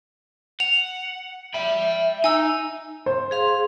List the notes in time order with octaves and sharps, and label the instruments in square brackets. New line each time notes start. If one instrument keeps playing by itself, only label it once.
[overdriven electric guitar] F#5 [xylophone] F7
[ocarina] E5 [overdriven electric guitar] G5 B5
[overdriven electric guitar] D#4 [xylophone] G#5 E6
[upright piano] C5
[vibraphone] G#4 F5 C6